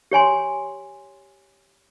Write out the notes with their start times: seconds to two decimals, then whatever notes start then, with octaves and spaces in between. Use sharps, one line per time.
0.11 G4 C#5 G#5 C6